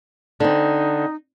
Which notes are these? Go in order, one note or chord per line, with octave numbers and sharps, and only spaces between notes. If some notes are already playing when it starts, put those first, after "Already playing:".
D3 C4 D#4